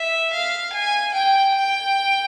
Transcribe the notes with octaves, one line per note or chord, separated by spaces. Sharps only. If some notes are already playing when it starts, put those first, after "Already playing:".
Already playing: E5
F5
G#5
G5
G5